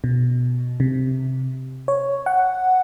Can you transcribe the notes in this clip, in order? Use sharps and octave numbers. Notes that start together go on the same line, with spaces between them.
B2
C3
C#5
F#5